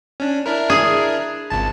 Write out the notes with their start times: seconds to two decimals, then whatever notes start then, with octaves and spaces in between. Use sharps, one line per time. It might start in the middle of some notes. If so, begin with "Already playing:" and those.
0.20 C#4 D4
0.46 D4 E4 A#4
0.70 G#4
1.50 G#1 C#2 A5